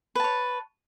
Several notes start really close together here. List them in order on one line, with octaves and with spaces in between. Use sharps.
B4 A5 C#5